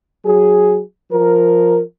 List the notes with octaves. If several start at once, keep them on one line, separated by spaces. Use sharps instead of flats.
F#3 G#4
F3 A#4